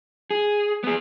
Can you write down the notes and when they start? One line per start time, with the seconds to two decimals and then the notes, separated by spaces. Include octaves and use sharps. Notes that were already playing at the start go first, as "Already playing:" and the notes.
0.31 G#4
0.84 B3 G#4